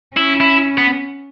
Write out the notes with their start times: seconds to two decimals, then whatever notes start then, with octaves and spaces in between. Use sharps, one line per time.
0.17 C#4 E4
0.40 E4
0.78 B3